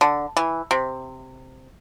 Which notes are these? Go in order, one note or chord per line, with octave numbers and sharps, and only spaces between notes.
D3
E3
C3